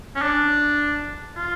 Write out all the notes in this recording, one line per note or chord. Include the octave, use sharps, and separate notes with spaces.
C#4
D4
F4